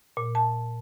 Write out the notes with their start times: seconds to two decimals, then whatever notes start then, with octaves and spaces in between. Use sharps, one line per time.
0.17 A#2
0.35 A5